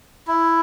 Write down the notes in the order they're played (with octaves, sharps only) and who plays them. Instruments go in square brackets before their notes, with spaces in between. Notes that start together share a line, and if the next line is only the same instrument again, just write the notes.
[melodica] E4